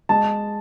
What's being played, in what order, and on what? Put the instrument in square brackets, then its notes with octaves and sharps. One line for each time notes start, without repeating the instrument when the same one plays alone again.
[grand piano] G#3 A5